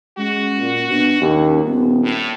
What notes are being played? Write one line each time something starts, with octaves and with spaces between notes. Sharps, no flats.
G#3 C#4 F#4
A#2
B2 D4
D#2 C#4
D#1 B3
A2 A#3